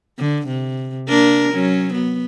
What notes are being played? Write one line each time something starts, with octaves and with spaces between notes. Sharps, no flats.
D3
C3
A#3 D4 A#4
F#3 C#4
B3